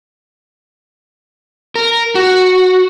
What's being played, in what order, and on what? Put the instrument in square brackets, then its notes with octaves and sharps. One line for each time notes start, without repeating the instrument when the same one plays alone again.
[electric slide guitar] A#4
F#4